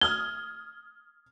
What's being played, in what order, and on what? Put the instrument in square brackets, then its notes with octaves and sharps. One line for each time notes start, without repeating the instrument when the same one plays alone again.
[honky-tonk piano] D#6 F6 G#6 [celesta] G7